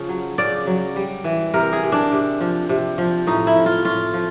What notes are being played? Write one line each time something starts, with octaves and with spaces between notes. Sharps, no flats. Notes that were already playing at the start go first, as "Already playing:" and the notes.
Already playing: C#3 F3
F#3
C#3 D5
F#3
G3
E3
C3 A#4
G#4
C3
D4
C3
F3
C3
F3
A2 D#4
E4
F3
F4
A2 F4
F3